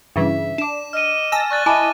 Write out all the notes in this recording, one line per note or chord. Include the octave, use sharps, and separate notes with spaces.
G2 C#3 E3 E5
D4 D6 E7
D#5 F6 D#7
G#5 A5 E6 A#6
D5 C#6 F#6 A6
E4 D#5 G#5 A5 D6